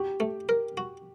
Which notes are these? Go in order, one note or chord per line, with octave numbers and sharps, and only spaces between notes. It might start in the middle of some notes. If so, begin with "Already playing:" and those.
Already playing: F#4 G4
A3
A#4
F#4